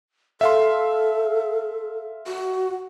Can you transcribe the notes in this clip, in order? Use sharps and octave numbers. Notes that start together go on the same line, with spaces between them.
A4 E5 F5 C6
F#4